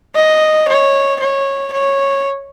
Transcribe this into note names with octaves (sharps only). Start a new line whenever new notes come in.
D#5
C#5
C#5
C#5